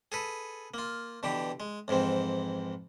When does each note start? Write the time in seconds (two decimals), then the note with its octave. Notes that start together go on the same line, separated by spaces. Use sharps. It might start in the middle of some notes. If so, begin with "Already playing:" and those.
0.12 G#4 A4 B4
0.74 A#3 F4
1.23 B2 D3 E3 G4
1.60 G#3
1.88 F2 G#2 E3 C4